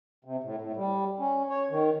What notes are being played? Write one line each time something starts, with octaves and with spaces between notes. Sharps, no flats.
C3
A2
A2
G3
C#4
C#5
D#3